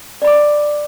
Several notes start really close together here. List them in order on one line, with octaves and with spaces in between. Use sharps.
D5 B5 D6